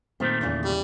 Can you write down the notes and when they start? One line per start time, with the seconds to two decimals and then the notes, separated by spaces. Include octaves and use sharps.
0.20 A#2 D#3 A3 C4
0.41 E2 C#3 E3
0.65 G3